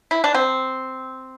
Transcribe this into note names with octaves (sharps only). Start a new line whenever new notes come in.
E4
D4
C4